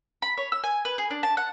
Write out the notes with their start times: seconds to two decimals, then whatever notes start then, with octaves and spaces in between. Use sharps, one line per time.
0.22 B5
0.37 C#5
0.52 E6
0.64 G#5
0.85 B4
0.98 G#4
1.11 D4
1.23 A5
1.37 F#5